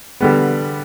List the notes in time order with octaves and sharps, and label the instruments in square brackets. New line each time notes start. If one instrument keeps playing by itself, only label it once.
[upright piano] D3 G3 B3